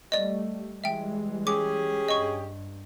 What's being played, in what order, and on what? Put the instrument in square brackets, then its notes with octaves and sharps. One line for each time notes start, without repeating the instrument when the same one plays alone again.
[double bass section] G3 A3 [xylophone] D5 D#5
[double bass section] E3 G3 G#3 [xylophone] E5 G5
[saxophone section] C#4 G4 G#4 [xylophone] D6
[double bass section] G2 [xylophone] D#5 C#6